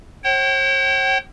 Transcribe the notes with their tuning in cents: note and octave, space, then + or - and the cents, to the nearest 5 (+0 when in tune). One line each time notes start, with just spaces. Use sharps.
C#5 -45 G5 -40